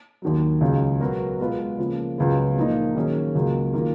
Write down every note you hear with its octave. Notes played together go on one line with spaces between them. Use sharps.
D#2 D#3 F#3
C#2 C#3 F#3
B2 F#3 B3 F#4 A#4
B2 G#3 B3 F4 B4
C#3 F3 A#3
C#2 C#3 F#3 B3 F4
A#2 F3 A#3 D#4
D#3 F#3 A#3 C#4 G#4
C#2 C#3 F#3 A#3
D#3 A#3 F4 A#4